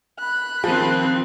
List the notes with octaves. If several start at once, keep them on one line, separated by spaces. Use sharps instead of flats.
B5 F#6
D#3 F3 C4